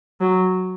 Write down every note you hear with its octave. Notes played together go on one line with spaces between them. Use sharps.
F#3